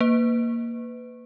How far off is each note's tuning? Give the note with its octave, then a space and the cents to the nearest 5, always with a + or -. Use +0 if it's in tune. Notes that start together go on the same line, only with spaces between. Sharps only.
A#3 +0 B4 +25